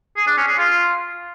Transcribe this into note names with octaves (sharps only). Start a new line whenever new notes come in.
G#4
D4
C#4
G#4
F4